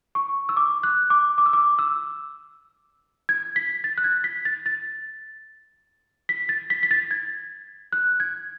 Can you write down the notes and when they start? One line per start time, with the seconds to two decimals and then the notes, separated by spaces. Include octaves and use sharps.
0.15 C#6
0.49 E6
0.57 D6
0.83 F#6
1.10 D6
1.38 D6
1.46 E6
1.53 D6
1.79 E6
3.29 G#6
3.56 B6
3.84 A6
3.98 F#6
4.04 G#6
4.24 B6
4.45 A6
4.66 A6
6.29 B6
6.49 A6
6.70 B6
6.83 B6
6.91 A6
7.11 G#6
7.92 F#6
8.20 G#6